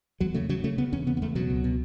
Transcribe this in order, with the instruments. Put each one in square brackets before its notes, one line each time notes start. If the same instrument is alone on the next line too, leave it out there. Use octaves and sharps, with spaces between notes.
[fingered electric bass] E2 F#3
C#3 A3
C#3 F#3
C#3 A3
C#3 B3
E2 C#4
C#3 B3
B3
E2 A3
B2 F#3
C#2
B2